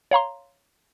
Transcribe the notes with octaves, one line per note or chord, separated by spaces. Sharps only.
C#5 F5 A#5 C6